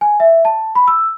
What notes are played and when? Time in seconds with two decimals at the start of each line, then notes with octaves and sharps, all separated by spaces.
0.01 G#5
0.20 E5
0.45 A5
0.75 B5
0.88 E6